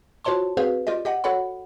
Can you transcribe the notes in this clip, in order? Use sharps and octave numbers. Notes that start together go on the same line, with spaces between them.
F4 F#4 C5 C#5 A5 C6
C4 F#4 G#4 B4 C5 F5
F4 G4 D5 D#5
G4 D#5 F#5
F#4 A4 C#5 F#5 B5